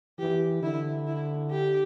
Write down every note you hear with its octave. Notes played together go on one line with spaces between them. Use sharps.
E3 G4
D3 E4
E4
G4